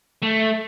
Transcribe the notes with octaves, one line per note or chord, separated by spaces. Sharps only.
A3